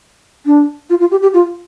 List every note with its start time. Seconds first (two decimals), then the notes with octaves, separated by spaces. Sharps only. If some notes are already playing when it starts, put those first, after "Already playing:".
0.46 D4
0.90 F4
1.00 F4
1.11 G4
1.22 G4
1.34 F4